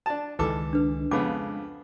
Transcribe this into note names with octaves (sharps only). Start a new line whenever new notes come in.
D4 A5
C#2 D#3 E3 G#3 A4 B4 D6
D4 B4
F2 C#3 G#3 B3 F#5 D6